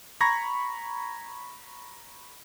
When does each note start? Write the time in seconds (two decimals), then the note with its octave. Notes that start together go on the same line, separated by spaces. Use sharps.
0.21 A#5 B5 C#6 G#6 A#6